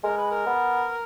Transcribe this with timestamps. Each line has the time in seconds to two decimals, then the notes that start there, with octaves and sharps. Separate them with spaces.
0.04 G#3 A#4
0.17 B4
0.31 A#4
0.47 B3